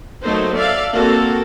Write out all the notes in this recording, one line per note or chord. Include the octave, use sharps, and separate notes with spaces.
F#3 A3 A#3 D#4 C5
A4 D5 E5 F5
A#3 C4 F#4 A4 D5